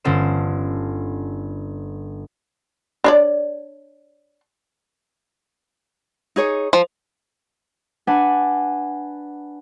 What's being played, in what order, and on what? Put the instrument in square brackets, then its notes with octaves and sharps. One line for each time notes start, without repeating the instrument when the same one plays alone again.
[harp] G1 D3 C#4 A4 C5 E7
[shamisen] D4 C#5 D5
[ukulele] D#4 G#4 C#5
[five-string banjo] F3
[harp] D4 B4 D5 F#5 G#5